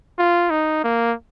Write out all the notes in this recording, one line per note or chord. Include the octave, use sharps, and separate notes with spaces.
F4
D#4
A#3